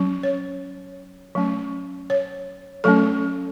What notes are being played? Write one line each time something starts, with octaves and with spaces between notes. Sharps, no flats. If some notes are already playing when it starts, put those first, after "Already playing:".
Already playing: F#3 C#4
C#5
F#3 A3 C#4
C#5
F#3 A3 C#4 A4